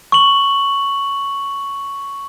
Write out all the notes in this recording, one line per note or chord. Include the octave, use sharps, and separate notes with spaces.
C#6 F#7